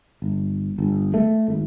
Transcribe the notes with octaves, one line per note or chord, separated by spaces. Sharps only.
G1
G1
A3
G#1